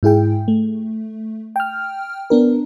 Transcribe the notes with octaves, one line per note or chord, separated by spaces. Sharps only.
G#2 E4 G#4 G5
A3
G5 F6
B3 D4 A#4